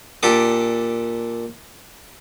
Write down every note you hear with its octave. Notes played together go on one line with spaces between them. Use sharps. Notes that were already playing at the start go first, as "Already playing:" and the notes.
A#2 D4 G4 A4 D#6